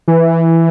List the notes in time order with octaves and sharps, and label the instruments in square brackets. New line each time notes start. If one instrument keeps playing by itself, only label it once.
[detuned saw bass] E3